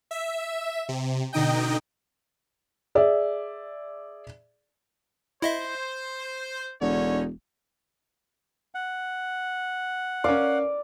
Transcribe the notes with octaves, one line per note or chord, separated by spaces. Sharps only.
E5
C3
B2 D3 D#4 D#5 G5
G#4 D5 E5
E4 C5 D#5 E5
E1 D3 C#4 D#4 C#5
F#5
C#4 A#4 D5 F5